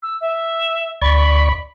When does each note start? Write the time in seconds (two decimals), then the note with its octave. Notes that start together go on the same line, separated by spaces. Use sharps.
0.02 E6
0.21 E5
1.02 D2 D5 B5 C#6